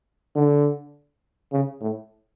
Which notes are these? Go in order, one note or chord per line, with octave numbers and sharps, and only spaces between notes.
D3
C#3
A2